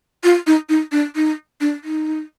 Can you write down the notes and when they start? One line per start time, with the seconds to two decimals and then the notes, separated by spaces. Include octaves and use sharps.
0.24 F4
0.47 D#4
0.69 D#4
0.92 D4
1.16 D#4
1.61 D4
1.84 D#4